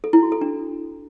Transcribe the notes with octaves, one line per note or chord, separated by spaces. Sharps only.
A4
E4
F#4
A4
D4